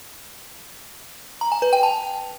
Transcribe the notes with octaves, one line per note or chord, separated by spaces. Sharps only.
A#5
G#5
B4
G5
A5